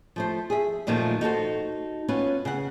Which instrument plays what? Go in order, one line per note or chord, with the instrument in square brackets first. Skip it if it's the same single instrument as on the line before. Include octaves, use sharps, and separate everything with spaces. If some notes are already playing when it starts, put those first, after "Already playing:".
[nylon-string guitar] F3 A3 C5
G#4 E5
F#2 A#2 D#3 F3 A3
D#4 F#4 A4 C5
B3 C#4 F4 B4
C#3 F#5